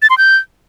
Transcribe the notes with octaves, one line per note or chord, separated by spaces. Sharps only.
A6
C6
G6